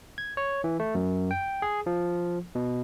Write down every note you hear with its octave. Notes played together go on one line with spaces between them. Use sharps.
G#6
C#5
E3
A3
F#2
G5
G#4
F3
B2